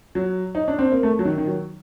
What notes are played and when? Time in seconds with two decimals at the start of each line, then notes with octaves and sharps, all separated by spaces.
0.15 F#3
0.55 D#4
0.68 D4
0.79 C4
0.92 A#3
1.03 A3
1.19 F#3
1.25 D#3
1.38 D#3
1.47 F#3